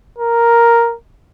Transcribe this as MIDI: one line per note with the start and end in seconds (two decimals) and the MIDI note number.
0.18 0.95 70